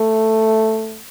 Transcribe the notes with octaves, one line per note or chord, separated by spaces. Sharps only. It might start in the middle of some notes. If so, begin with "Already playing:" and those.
Already playing: A3